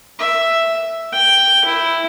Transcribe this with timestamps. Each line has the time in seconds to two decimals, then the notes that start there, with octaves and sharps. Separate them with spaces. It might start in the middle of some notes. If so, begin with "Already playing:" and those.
0.19 E5
1.12 G5
1.65 E4